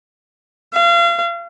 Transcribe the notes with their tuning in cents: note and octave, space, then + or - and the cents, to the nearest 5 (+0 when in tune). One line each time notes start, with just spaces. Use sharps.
F5 -35